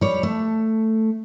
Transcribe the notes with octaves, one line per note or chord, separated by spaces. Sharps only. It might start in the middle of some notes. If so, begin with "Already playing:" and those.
G3 C#5
A3